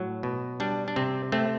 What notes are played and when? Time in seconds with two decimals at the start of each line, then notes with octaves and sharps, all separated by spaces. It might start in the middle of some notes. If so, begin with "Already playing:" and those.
Already playing: A2 F#3
0.23 B2
0.60 G3 D4
0.88 D4
0.96 C3 C4
1.32 A3 C4